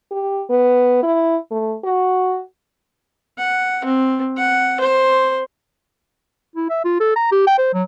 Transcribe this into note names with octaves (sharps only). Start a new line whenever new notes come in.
G4
B3
E4
A3
F#4
F#5
C4
F#5
C5
E4
E5
F4
A4
A#5
G4
G5
C5
F#3